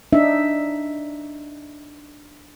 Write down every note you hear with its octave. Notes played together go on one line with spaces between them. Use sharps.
D4 D#4 E5